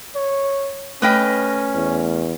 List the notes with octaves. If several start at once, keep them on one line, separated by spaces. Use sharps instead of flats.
C#5
A3 C#4 B4 D#5 G5 F6 B6
E2